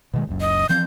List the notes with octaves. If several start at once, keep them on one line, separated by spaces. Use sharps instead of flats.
B2 D#3 G#3
F#1 C#2 F#2
D#5
E3 F3 C4 G6